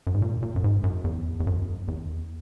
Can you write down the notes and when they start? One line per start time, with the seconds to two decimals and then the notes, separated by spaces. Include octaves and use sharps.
0.07 F#2
0.14 G#2
0.22 A#2
0.42 A#2
0.56 F#2
0.64 G#2
0.84 F#2
1.04 E2
1.40 E2
1.47 F#2
1.88 E2